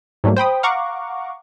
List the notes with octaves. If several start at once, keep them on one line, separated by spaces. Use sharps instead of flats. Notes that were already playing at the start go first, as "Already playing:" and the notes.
G#2 F#3 G3 A3 A#3
C5 G5 B5 D#6
F5 F#5 A#5 C#6 D6